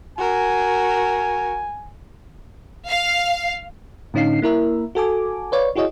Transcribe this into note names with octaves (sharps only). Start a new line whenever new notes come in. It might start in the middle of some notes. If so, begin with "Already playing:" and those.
F#4 A#4 G#5
F5
A2 D3 C#4 D#4 F5 C7
A#3 E4 A#4 E5
F#4 A4 G#5 D6
B4 C#5 D5 F5
E4 F#4 G#4 C#5 D#5